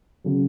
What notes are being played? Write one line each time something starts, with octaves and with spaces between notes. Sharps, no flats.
C#3 F#3